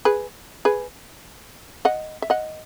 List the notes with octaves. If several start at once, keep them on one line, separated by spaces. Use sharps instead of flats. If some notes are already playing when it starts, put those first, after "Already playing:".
G#4 B4
G#4 B4
D#5 F#5
E5
D#5 F#5